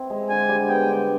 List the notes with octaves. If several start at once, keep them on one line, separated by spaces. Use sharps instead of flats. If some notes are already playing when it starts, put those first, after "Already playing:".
Already playing: C4 E4
G#3
D3 G#5
G3
B3 G5
D3